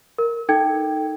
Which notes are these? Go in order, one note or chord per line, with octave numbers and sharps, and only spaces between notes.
A#4
D#4 A4 G5 G#6